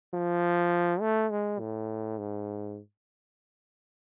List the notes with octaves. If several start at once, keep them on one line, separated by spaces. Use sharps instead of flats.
F3
A3
G#3
A2
G#2